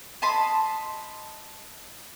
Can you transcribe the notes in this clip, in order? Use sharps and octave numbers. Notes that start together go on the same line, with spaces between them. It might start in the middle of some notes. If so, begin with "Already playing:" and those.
D#5 A5 B5 C6